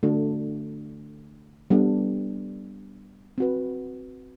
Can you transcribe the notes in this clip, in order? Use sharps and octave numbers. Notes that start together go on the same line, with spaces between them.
D3 A3 D4 F#4 A4
G3 B3 D4 A4
C4 F#4 B4